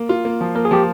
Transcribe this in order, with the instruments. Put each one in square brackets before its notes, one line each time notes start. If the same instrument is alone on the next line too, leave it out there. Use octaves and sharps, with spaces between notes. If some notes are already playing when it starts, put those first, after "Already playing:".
Already playing: [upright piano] A#3
F4
A#3
F3
[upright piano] A#3 [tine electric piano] A#4
[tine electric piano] G#4
[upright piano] F3 [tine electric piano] G4